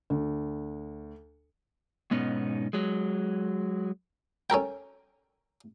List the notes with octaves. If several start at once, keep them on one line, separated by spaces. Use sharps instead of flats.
D2
G#2 B2 B3 C#4 D#4
F#3 G#3
C#4 A4 A#4 G5